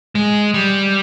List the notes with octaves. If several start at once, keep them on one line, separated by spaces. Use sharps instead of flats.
G#3
G3